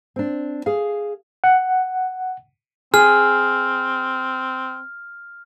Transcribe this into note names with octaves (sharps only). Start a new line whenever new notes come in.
C4 D4
G#4 F5
F#5
C4 G#4 F6